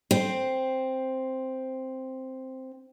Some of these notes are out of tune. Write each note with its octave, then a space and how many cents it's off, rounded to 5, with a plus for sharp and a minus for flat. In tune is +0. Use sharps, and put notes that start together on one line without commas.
C4 +0 C5 +0